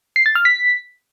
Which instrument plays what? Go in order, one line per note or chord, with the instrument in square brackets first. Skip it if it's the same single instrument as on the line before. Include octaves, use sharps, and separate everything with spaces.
[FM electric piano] C7
A6
F6
B6